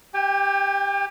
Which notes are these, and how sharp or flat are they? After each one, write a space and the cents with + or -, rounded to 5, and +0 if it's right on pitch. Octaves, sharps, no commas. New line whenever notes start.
G4 +5 G5 +40